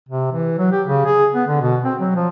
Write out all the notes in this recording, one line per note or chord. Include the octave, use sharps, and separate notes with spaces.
C3
E3
F#3
G4
C#3
G#4
B3
D3
B2
C4
F#3
F3